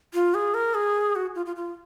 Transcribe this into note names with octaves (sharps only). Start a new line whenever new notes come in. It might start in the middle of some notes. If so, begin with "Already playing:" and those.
F4
G#4
A#4
G#4
F#4
F4
F4
F4